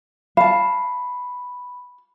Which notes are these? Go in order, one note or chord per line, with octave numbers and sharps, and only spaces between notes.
F5 A5 B5